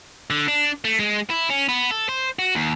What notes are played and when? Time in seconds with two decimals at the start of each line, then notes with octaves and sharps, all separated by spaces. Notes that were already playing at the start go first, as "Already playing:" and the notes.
0.30 D3
0.48 D4
0.84 A3
0.99 G#3
1.30 E4
1.50 C#4
1.69 B3
1.91 A4
2.09 C5
2.39 F#4
2.55 D#2